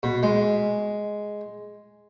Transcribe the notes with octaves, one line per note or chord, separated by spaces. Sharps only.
B2
G#3